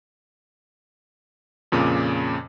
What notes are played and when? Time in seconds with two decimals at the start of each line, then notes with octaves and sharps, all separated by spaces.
1.72 F2 A#2 C#3 D6 D#7